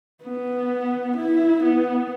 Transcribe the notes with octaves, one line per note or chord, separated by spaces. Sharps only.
B3
E4
B3